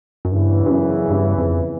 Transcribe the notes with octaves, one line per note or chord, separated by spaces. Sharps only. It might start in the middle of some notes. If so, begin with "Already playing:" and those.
F#2
E2 G2 C#3 E3
G2
F#2
G2
F2